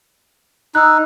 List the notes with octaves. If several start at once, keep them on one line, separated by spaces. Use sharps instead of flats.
D#4 E6 F#6